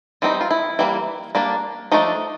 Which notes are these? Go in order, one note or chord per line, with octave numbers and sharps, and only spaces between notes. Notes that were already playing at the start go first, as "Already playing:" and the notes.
E3 G3 C4 D#4 F4
F4
E4
E3 G3 A#3
G3 A#3 D4
F3 A3 D4 D#4